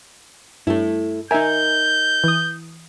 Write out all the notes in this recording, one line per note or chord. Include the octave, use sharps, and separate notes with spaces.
G2 A3 E4
D#4 A#4 E5 G#5 G6
E3 D#6